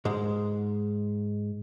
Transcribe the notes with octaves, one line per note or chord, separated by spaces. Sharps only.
G#2 G#3